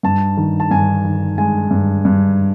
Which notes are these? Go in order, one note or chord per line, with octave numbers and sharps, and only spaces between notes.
G2 A5
D#3
A5
G2 G#5
D#3
G#3 G#5
G2
G2